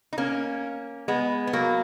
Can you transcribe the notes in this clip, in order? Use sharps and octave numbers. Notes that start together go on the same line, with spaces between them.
D#4
A#3 C#4
G#3 B3
B3
F#3 A#3